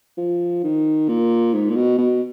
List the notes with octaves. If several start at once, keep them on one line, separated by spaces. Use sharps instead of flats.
F3
D#3
A#2
G#2
A#2
B2
B2